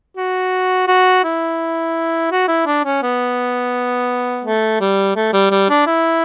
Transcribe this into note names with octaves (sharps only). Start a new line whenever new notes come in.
F#4
F#4
E4
F#4
E4
D4
C#4
B3
A3
G3
A3
G3
G3
D4
E4